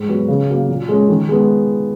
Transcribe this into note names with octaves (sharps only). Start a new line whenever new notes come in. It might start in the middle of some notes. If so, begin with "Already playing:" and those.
Already playing: G#2
F#3 B3 F#4 B4
C#3
F#3 A#3
A#2
G#3 C#4
D#3
G#3 B3